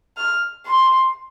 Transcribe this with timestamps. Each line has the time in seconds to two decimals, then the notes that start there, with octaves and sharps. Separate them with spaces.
0.17 F6
0.66 C6